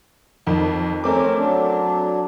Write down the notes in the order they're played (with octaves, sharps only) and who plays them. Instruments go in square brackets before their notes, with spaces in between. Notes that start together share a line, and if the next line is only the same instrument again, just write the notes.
[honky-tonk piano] F2 D#3
[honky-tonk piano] A3 C4 D6 [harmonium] C#4 A#4
[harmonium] F#3 D4